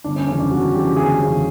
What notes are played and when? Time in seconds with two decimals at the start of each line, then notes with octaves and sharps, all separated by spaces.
0.04 G1 D4
0.16 C#4
0.28 F2 C#3 E3 C#4
0.39 D4
0.51 G1 F#4
0.74 F2 C#3 E3 G4
0.96 G1 G#4
1.20 F2 C#3 E3